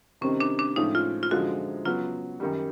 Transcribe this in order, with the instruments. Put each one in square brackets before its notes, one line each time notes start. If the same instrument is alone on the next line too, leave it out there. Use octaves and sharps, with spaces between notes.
[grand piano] C3 D#3 G3 C4 D#4 [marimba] C#4
[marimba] D4
D4
[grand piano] A2 F3 G#3 C#4 [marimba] D#4
[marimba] F4
F4
[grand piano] F#2 D3 F3 G#3 [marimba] F#4
[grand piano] C#3 F#3 B3 [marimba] F4
[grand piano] F#2 D#3 G3